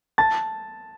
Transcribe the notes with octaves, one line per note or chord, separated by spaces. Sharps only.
A5 A6